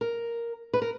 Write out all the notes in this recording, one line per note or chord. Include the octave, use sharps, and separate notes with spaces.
A#4
B4
A#4